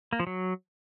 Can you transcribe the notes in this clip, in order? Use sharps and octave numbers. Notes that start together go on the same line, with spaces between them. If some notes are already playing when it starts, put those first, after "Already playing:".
A#3
F3
F#3